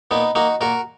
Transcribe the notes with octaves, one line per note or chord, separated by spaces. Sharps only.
A#2 B3 D#4
A#3 D#4 F#4
A#2 F#4 A#4